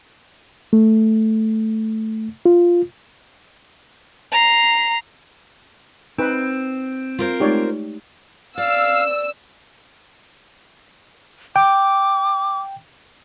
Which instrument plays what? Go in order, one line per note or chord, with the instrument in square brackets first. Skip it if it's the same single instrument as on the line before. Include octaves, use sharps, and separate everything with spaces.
[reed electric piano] A3
F4
[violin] A#5 C7
[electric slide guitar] C4 [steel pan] D#4 B4
[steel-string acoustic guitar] F4 A#4 C5
[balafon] G#3 A3 D#4 [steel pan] G4 C#5 D5
[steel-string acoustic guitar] D5 [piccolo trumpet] F5 [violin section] E6
[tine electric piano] G5 [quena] D6